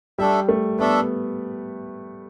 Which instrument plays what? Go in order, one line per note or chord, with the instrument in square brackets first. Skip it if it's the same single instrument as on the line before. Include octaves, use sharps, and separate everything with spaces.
[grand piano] G3 [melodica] A3 D4 A4 E5
[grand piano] A3
[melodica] A3 D4 A4 E5 [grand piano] B3